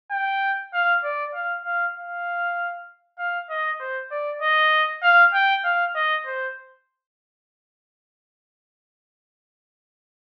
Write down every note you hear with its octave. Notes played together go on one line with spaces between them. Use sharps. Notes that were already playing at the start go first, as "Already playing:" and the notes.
G5
F5
D5
F5
F5
F5
F5
D#5
C5
D5
D#5
F5
G5
F5
D#5
C5